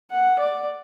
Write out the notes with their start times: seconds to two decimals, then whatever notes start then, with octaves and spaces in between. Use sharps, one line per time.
0.11 F#5
0.39 D5